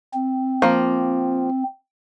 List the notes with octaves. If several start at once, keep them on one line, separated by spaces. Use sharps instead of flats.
C4
F3 A#3